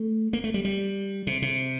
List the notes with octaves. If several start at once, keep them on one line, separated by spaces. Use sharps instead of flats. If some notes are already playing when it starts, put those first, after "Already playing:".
Already playing: A3
A#3
A3
G3
G3
C3
C3